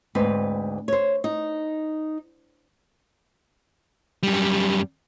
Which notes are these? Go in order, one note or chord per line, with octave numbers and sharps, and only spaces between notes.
D2 G#2 C4 B4
C5 C#5
D#4
F#2 G3